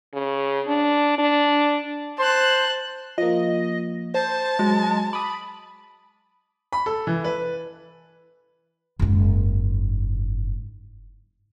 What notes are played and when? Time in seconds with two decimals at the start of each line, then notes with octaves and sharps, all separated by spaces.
0.13 C#3
0.68 D4
1.18 D4
2.19 C5 A5 F#6
3.18 F3 A#3 D#5
4.14 C5 A5
4.59 F#3 G#3
5.13 B5 D6 D#6
6.72 B5
6.86 A4
7.07 E3
7.24 B4
8.99 F#1 G#2